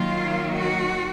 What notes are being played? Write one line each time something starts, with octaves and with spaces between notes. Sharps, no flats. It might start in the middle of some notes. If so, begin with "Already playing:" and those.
Already playing: D#3 F#3 A#3 F4
F#4